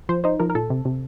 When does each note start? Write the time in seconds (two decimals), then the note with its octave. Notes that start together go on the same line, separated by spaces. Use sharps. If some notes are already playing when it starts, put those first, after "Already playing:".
0.09 F3 C5
0.24 D#4 C5
0.40 F3 A#4
0.50 A#4
0.55 A#2 A4
0.70 C3
0.85 C3